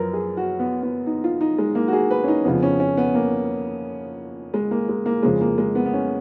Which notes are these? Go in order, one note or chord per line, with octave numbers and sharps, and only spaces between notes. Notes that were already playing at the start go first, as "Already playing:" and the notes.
Already playing: F#2 F3 A#4 B4
G#4
F#4
B3
B3
D#4
F4
D#4
G#3
A#3
F#4
G#4
B4
C#4
D#4
F2 C#3 F3 B3
C#4
C#4
B3
A#3
G#3
A#3
G#3
A#3
F2 C#3 F3 G#3
A#3
G#3
B3
B3
C#4